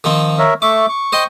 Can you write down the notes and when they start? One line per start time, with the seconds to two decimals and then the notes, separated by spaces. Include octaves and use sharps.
0.04 D#3 F3 C4
0.39 A#4 C#5 E5
0.62 A3 E5 C#6 D6
0.89 C#6
1.12 C5 D#5 G5